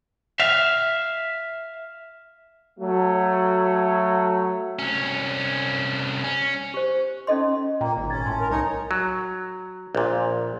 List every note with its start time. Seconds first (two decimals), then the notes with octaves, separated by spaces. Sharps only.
0.40 E5 F5
2.79 F#3 A3
4.79 C2 C#4
6.24 C#4
6.74 G4 C5
7.27 C#4 D#4 A4 D#5 C6
7.81 A#2 A#3 G5 A#5
7.97 G#1 A#2
8.10 C#4 G#6 A6
8.26 A2 G#5 A5 C6
8.39 A#4
8.51 C2 D#4 C#5 D#5
8.91 F#3
9.95 A#1 A#2